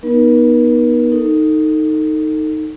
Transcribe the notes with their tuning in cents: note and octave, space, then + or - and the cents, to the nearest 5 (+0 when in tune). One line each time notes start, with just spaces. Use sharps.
B3 -25 D#4 +0 A#4 +45
D#4 +0 A4 +25